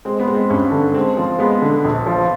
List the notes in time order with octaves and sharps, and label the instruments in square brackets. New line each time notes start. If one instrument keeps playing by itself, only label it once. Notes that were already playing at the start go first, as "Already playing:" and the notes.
[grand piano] G#3 [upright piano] C4
[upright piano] B3
[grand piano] G#3
[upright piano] C4
[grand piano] G2 [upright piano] C#4
[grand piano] D3
[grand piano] G#3 [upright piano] C4
[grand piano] F3
[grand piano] G#3 [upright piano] B3
[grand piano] D3
A#1
F3